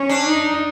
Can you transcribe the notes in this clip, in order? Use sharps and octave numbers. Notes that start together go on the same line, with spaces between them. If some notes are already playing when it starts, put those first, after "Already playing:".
Already playing: C#4
D4
D#4